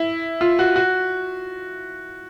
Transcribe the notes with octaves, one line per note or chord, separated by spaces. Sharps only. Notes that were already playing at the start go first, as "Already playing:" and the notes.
Already playing: E4
F4
F#4
F#4